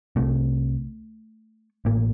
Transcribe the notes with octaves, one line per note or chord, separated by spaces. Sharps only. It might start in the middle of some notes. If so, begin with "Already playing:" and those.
C2 C3 A3
A1 A2 A#3